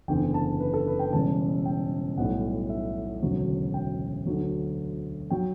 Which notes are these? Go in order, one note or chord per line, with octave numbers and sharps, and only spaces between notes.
F#1 E2 D3 G5
A5
B4
A4
B4
G5
E1 E2 C#3 G3 A5
G5
B1 A2 G3 F#5
E5
E1 D2 C#3 F#3
G5
D2 D3 F#3
F#3 G5